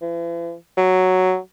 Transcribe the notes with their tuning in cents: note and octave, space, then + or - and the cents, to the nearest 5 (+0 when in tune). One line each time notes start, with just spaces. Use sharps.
E3 +45
F#3 +0